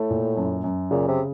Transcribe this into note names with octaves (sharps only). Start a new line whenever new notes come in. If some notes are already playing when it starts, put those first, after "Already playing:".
Already playing: A2 A3
A#2
F#2
F#2
A#2 C#3
C3